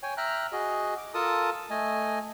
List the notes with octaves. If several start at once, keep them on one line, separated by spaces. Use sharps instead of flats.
C#5 G5 G#5
E5 G5 A#5 F6 F#6
F#4 G#4 D#5
D6
F4 A4 A#4 A5 D#6
A3 D#5 G#5